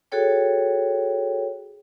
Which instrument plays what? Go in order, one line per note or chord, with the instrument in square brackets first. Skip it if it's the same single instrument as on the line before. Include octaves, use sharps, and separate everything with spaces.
[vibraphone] F#4 G#4 A4 C#5 G5